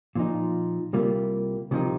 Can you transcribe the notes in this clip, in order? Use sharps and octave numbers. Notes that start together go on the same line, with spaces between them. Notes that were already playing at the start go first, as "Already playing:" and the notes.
A#2 F3 D#4
C2 C3 G3 A#3 F4
C2 C3 F3 D#4